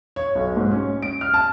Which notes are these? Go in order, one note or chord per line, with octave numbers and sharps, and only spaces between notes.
C#5
B1
G#2
C#4
D7
F6
A5